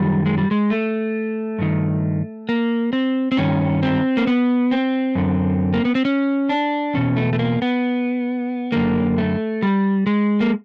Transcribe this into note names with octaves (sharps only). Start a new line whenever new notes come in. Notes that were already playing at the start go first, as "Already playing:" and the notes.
Already playing: F#2 D#3 G3
G#3
G3
G#3
A3
G2 D#3
A#3
C4
C4
G2 D#3 C#4
C4
A#3
B3
C4
F#2 D3
A#3
B3
C4
C#4
D4
E2 B2 C#4
A3
A3
A#3
B3
F#2 D3 A#3
A3
G3
G#3
A#3